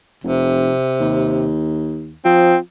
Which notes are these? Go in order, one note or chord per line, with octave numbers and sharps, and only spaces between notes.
F1 C3
D#2
F3 C4